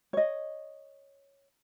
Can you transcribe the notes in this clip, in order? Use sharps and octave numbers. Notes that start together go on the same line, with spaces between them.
C#5 D#5